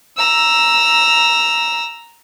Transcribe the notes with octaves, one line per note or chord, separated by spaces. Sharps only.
A#5 E6